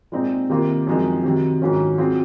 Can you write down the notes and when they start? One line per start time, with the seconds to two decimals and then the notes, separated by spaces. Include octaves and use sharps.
0.12 A#2 G#3 C4 D#4
0.49 C3 D#3 A#3 F4
0.87 F#2 F3 G#3 C4 D#4
1.24 C3 D#3 F#3
1.62 G#2 D#3 F#3 C#4 F4
1.98 F#3 C4 F4 G#4